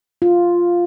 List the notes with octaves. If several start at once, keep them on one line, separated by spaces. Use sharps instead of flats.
F4